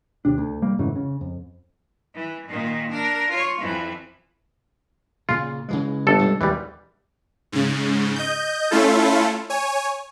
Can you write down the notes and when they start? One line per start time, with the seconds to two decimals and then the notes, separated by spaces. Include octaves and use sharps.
0.25 D#2 C3 D4
0.38 D2
0.62 F1 G3 A#3
0.79 F2 G#2 C#3 E3
0.96 C#3
1.21 F2
2.15 E3
2.48 A#2 D#3
2.90 D4 A#4
3.30 F4 C#5
3.60 F2 E3
5.29 A#2 C#3 F4
5.69 C#3 E3 G#3
6.07 G1 A4
6.19 G2 C3 G#3
6.41 A#1 D#2 E3 G3 G#3
7.52 G#2 C#3
8.16 D#5 G6
8.71 A3 C#4 E4 F4 A4
9.50 C#5 G#5